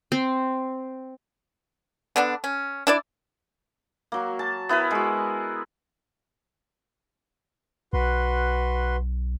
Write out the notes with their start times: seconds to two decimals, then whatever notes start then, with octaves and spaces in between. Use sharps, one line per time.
0.12 C4
2.16 D3 B3 D4
2.44 C#4
2.87 D4 E4 D5
4.12 F#3 A#3
4.39 A5
4.69 B3 E4 A#4 B4
4.91 G#3 F#4
7.93 B1 F#4 B4 C6